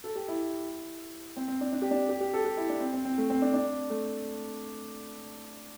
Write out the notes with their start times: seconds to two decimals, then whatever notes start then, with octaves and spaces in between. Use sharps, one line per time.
0.04 A4
0.16 G4
0.28 E4
1.37 C4
1.48 C4
1.61 D4
1.73 D4
1.82 G4
1.91 D4
2.09 G4
2.20 G4
2.34 A4
2.45 G4
2.57 E4
2.69 D4
2.81 C4
2.93 C4
3.05 C4
3.18 A3
3.30 C4
3.42 D4
3.54 D4
3.90 A3